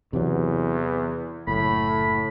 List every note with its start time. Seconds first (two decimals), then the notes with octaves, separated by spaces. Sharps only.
0.13 E2 C3 E3 F#3
1.47 F#1 A2 B5